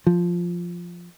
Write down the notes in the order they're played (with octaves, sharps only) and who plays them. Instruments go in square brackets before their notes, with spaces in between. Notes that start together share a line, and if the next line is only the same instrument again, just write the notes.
[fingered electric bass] F3